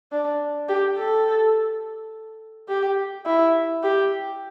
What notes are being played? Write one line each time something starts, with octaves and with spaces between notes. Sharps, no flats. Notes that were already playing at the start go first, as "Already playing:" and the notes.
D4
G4
A4
G4
E4
G4